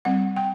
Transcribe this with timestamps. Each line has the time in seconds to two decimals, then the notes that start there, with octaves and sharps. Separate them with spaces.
0.05 G3 C4 F#5
0.36 G5